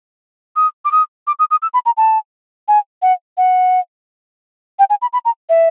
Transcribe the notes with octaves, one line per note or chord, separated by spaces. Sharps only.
D#6
D6
D#6
D6
D#6
D#6
E6
B5
A#5
A5
G#5
F#5
F#5
G5
G#5
B5
B5
A#5
E5